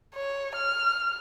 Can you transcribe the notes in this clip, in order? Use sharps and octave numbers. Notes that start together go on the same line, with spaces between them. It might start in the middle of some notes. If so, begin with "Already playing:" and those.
C#5
F6